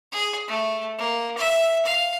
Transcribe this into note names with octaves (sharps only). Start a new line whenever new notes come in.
G#4
A3
A#3
E5
F5